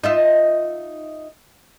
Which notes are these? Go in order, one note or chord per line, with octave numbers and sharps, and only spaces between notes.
D#4 F4 E5